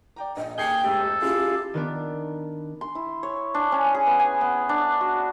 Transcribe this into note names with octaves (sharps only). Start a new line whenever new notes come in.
D5 G5 A#5
A#1 D#5
D#2 G#4 G5 G6 C7 C#7
F1 G#2 G4 A4
F#2 E4 F4 G4 G#4 F5
D#3 B3 D4
C6
E4
C#5
D4
C#4
G#4
B3
G#5
B3
D4
F#4